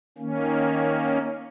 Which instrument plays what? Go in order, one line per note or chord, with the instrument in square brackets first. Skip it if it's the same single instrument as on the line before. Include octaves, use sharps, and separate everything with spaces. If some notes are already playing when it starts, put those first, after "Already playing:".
[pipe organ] D#3 A#3 C#4